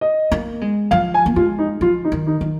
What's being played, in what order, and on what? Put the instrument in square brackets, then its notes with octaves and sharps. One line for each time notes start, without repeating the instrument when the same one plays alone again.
[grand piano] D#5
[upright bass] A#3
G#3
[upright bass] F3 [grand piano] F5
[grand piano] G#5
[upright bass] A#3
[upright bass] G#3 [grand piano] F4
[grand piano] D#4
[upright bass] F3 [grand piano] F4
[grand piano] D#4
[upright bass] D#3
[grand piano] D#4
[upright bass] D#3